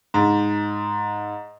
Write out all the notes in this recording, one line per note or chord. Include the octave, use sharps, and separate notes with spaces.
G#2